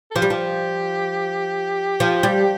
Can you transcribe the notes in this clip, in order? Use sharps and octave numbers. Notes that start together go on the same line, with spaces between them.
A4
F3 G4
G3
F3
F3
G3